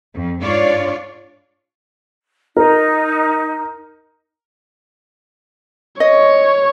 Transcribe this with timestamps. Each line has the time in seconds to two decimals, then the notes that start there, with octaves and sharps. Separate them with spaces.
0.13 F2
0.42 G#2 D4 F4 C#5 D5 F5
2.57 D#4 A#4
6.00 C#5 D#5